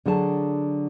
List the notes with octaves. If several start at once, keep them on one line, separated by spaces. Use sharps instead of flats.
D3 F#3 G#4 A5